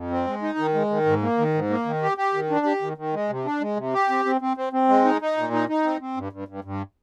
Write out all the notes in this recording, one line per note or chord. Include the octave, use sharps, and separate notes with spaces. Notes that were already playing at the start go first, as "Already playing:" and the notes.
Already playing: F2
C4
G#3
D#4
D#3
G#3
D#3
G#2
A#3
D#3
G#2
A#3
D#3
G4
G4
D#3
D4
G4
D#3
D#3
G#3
C3
D4
G#3
C3
G4
C4
C4
C4
C4
C4
G#3
D#4
D#4
A#2
D#4
D#4
C4
C4
G2
G2
G2
G2